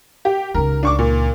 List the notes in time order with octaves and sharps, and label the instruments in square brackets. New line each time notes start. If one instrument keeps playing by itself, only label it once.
[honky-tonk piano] G4
[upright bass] C#2 D#4 [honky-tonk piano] A#4
[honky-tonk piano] D4 C#6 D6
A#2